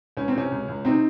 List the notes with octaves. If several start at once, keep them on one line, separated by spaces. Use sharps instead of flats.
C#2 C#4
C4
C3 C#4
C#2
C#2
C3 C4 D#4